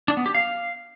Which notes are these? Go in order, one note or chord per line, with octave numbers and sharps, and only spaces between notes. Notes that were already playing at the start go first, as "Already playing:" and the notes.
D4
B3
G4
F5